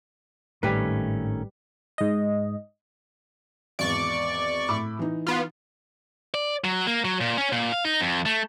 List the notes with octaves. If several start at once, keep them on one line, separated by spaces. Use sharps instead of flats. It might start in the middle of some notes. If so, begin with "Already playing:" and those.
G#1 A2 D#3 G3 A3 C#4 B4
G#2 D#5
G#1 E2 D5 C#6
A2 B5 D6
E3 D#4
B3 F4
D5
F#3
A#3
F#3
A#2
C#4
A#2
F5
D#4
F2
A3